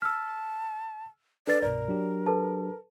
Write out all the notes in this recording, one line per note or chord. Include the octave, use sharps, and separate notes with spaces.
A5 E6 F6 B6
D4 A4 B4 D5 A6
C2 G2 B2 A#4 D5
F#3 D4 G4
A4 B4 A5